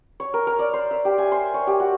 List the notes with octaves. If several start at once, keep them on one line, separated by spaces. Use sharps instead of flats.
C#5
A#4
A#4
D5
C5
E5
G4
G#5
C5
C#5
G4
F#4